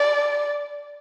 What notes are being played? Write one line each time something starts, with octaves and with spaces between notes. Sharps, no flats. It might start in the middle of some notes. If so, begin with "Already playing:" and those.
Already playing: D5